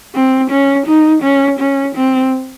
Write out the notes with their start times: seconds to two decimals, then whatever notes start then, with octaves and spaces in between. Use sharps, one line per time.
0.15 C4
0.51 C#4
0.87 D#4
1.23 C#4
1.60 C#4
1.96 C4